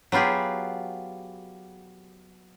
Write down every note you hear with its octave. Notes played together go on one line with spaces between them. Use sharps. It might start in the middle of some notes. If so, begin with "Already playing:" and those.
F#3 B3 F4 G4 G#4